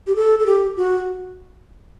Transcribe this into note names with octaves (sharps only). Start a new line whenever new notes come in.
G4
A4
A4
G4
F#4